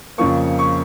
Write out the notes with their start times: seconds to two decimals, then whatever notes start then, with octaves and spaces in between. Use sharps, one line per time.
0.18 F2 C#3 F3 A#3 C#6
0.59 C#6